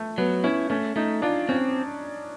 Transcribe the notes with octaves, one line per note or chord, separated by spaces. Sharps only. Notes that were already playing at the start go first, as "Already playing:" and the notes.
Already playing: A3
F#3 B3
C#4 E4
A3 C#4
A3 D#4
D4 F4
C4 C#4